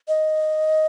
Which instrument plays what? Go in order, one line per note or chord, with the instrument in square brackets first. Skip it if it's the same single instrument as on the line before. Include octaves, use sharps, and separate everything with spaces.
[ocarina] D#5